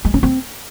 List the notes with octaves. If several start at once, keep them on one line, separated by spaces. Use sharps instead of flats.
G#3
C#4
C4